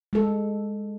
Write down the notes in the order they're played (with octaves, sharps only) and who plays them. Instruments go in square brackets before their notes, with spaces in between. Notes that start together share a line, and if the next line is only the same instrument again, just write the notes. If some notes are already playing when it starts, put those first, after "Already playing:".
[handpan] G#3 A4